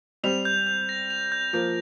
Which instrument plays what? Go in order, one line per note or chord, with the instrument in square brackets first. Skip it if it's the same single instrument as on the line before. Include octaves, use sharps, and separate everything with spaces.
[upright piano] G3 C4 [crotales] F7
[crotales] G6
G6
A#6
F7
G6
[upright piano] F3 A#3 [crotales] G6